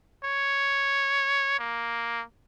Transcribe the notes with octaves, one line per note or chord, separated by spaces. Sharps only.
C#5
A#3